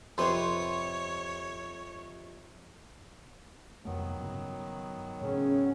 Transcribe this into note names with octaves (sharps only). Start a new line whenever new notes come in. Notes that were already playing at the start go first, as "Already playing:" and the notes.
F2 C3 B4 C#5 C6
C2 F2 D#3 F#3 A3 B3
G2 C#3
A2 C#3 C#4